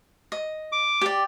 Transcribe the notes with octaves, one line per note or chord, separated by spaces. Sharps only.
D#5
D6
G4 D5